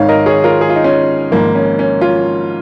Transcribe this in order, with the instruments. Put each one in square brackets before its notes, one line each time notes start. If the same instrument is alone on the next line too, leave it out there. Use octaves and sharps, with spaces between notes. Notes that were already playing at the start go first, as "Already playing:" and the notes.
Already playing: [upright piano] G#1 G#2 D#3 C#5 F5
A#4 D#5
G#4 C#5
F4 A#4
G#4
F4
D#4
C#4 F4
G#1 G#2 F3 A#3
C#4
C#4
C#4 F4